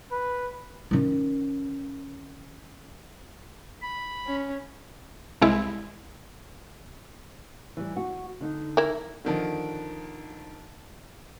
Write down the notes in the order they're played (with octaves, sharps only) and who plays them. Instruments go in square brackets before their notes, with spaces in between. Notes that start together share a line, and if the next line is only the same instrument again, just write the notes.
[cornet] B4
[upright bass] D#3 C#4
[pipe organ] B5
[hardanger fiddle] C#4
[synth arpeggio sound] C2 G#3 E4
[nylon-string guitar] E3 G3
F#4
D3 D#4
[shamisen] E4 A#4
[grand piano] D3 D#3 F3